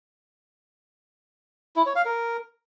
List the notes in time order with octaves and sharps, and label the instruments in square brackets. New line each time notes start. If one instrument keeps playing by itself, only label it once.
[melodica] E4
C#5
F5
A#4